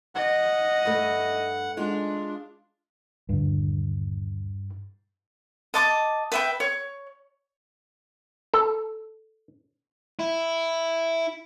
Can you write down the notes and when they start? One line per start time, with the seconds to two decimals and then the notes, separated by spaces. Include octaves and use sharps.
0.15 D#5 F#5
0.85 G2 A3
1.77 G#3 D4 F4
3.29 D#1 G2 D3
5.74 D#5 A5 D6
6.32 B4 E5 G5
6.60 C#5
8.54 A4
10.19 E4